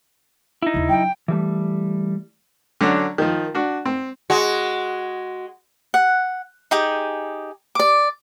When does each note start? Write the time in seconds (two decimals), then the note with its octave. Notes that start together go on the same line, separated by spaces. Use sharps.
0.62 D#4 E4
0.74 D#2 C#3
0.89 F#3 G5
1.28 E3 G3 A3
2.81 D3 F#3 C#4 D4
3.18 D#3 F3
3.55 D4 F#4
3.86 C4
4.30 G#3 F#4
5.94 F#5
6.71 D#4 G4 G#4
7.75 D5 D6